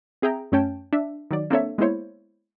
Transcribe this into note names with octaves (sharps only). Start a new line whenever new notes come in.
C4 G#4 E5 G5 A#5
F#2 A3 C#4 C#5 G5 A5
D4 E5
D#3 F#3 D5
A#3 C4 D4 A4 C#5 E5
G#3 A#3 B3 E4 C5 C#5